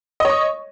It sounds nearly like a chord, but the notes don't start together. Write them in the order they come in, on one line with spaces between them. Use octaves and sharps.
D#5 C#5 C#6